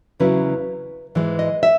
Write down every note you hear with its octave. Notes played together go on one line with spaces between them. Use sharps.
E2 C#3 F#3 C#4 E4 B4
G#2 E3 G#3
D#5
E5